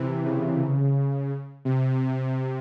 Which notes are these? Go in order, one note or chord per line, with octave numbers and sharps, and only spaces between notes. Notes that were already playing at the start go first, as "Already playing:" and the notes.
Already playing: C3 E3
C#3
C3